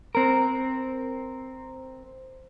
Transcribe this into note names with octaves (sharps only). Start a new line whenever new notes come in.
C4 A#4